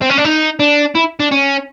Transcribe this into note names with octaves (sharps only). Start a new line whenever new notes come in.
C4
C#4
D4
D#4
D4
E4
D4
C#4